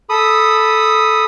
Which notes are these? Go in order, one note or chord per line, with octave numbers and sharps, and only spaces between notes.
A4 B5 D#6